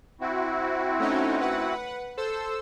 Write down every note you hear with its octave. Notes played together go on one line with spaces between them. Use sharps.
C4 E4 F#4
A3 C#4 D#4
B4 F#5
A4 C5 E6